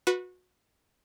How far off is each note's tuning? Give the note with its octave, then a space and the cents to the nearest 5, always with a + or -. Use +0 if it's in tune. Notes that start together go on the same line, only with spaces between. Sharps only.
F#4 -25 B4 -10 B5 +40